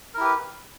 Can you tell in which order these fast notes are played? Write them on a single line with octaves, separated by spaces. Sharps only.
A#4 E4 G4 B4